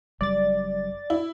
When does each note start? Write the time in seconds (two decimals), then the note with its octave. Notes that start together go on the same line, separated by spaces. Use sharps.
0.21 F#1 F#2 G3 D5 A6
1.10 E4